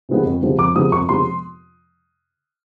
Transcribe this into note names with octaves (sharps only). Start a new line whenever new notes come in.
C3 F3 G#3 B3
F2
C3 F3 G#3 B3
F2 D6
C3 F3 G#3 B3 D#6
F2 C#6
C3 F3 G#3 B3 C6